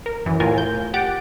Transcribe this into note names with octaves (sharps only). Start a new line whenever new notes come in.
A#4
F#2 E3
E2 A2 F4 A#4 G#5
G6
G4 F#5 D6 A6 D7